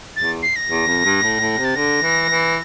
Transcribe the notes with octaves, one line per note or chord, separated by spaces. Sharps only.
E2 A6
C7
A#6
E2
F2
G2
A2
A2
C3
A6
D3 A#6
E3
E3